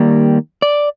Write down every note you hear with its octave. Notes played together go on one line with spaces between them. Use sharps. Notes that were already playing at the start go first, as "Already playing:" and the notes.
Already playing: D#3 G3 A#3
D5